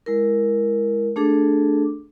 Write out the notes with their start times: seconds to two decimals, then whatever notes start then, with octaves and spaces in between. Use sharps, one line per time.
0.06 G#3 E4 A#4
1.16 A3 D4 G#4 A4 D6